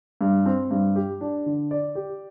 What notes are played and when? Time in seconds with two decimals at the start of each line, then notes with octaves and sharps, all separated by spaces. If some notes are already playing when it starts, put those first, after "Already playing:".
0.21 G2
0.46 C4
0.71 G2
0.96 G4
1.21 D4
1.46 D3
1.71 D5
1.95 G4